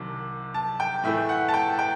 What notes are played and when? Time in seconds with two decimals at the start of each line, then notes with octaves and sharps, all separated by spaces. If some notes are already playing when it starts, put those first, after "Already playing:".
Already playing: C2 C3 D#3 F#3
0.54 A5
0.80 G5
1.04 A2 E3 A3 E5
1.29 F#5
1.49 A5
1.54 G5
1.79 G5